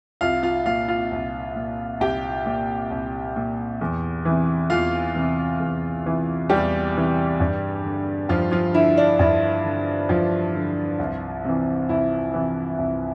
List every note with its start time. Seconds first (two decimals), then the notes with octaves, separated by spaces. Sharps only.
0.21 C2 F4 F5
0.43 F4 F5
0.66 A#2 F4 F5
0.88 F4 F5
1.11 C2
1.56 A#2
2.00 C2 G4 G5
2.46 A#2
2.91 C2
3.36 A#2
3.81 E2
4.25 C3 E3
4.70 E2 F4 F5
5.15 C3 E3
5.60 E2
6.05 C3 E3
6.49 E2 G3 G4
6.95 C3 E3
7.40 G2
7.84 D3
8.29 G2 F3 F4
8.51 F3 F4
8.74 D3 E4
8.97 D4
9.19 G2 E4
9.64 D3
10.09 G2 F3 F4
10.54 D3
10.99 C2
11.44 C3 E3
11.89 C2 E4
12.34 C3 E3
12.78 C2